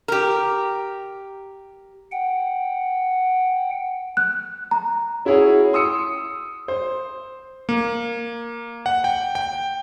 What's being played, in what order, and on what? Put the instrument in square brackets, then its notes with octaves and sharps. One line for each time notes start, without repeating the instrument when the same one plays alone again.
[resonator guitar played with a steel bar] G4 A#4
[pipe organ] F#5 G5
[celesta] F#6
A#5
[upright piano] C#4 E4 F#4 G#4 C#5
C6 D#6 E6 C#7
C5
[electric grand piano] A#3
F#5
G5
G5